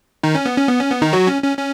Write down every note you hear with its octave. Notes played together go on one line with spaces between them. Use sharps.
D#3 D#4
C#4
B3
C#4
B3
C#4
B3
D#3 D#4
F#3 F#4
C#4
C#4
C#4